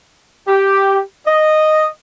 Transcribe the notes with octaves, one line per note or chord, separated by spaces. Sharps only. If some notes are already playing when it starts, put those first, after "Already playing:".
G4
D#5